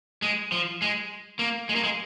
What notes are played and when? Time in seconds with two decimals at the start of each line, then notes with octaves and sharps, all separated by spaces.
0.22 G#3
0.52 F3
0.82 G#3
1.39 A#3
1.69 G#3
1.75 A#3
1.84 G#3